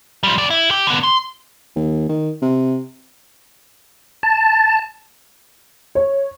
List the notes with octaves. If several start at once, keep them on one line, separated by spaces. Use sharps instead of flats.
F3 G3
F2 D5
E4
G4
D3 B3
C6
D#2
D#3
C3
A5
C#5